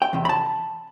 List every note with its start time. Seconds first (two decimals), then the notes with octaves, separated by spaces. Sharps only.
0.02 G5
0.13 E2 C3
0.25 B5
0.29 A5